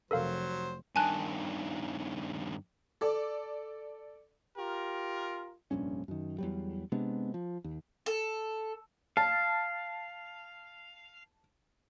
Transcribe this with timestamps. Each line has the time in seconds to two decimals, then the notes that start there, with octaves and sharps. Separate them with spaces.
0.11 F1 F#3 A4 A#4 C5 F5
0.96 G2 D#3 G#5 A5 F#6
3.01 A4 D5
4.58 F4 G4 A#4
5.71 F1 A#1 G2 C#4
6.08 F#2 D#3
6.38 E2 F#3 G3
6.92 C3 G#3 B3 D4
7.34 F3
7.64 D#2
8.06 A4
9.17 F5 A5